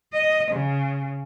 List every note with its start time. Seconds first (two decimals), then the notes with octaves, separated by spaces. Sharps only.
0.13 D#5
0.52 C#3